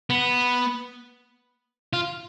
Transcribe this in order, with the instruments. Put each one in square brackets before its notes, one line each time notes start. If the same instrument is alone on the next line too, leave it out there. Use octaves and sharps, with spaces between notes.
[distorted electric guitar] B3
F4